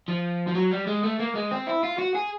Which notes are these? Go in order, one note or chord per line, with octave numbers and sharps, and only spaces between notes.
F3
F3
F#3
G3
G#3
A3
A#3
G#3
C4
E4
F4
F#4
G#4